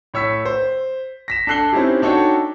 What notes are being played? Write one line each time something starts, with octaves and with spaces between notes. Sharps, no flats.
A2 C#5 E6 B6
C5
A#6 B6 E7
D4 A4 F#6 C7 G7
C4 C#4 D#4 E4 G4
D4 D#4 F#4 A4 C#5 G5